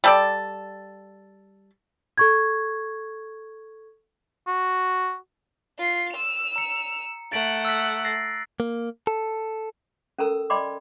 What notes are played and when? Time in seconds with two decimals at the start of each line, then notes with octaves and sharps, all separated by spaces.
0.04 G3 A4 D5
2.18 A4 C#6 G#6
4.47 F#4
5.78 F4 C7
6.12 E6 F7
6.56 A#5 C#7
7.32 A3 F#5 A6 D7 F#7
7.65 E6 F#6 B6
8.05 A6 A#6 C7
8.60 A#3
9.07 A4
10.19 C#4 A4 A#4 A#5 E6
10.50 D5 D#5 G5 B5 C6 D6